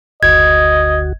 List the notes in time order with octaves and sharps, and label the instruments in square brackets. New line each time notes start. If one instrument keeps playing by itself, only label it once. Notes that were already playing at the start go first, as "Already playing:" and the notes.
[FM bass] F#1 [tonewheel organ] D2 F#4 [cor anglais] D#5 [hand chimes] G#6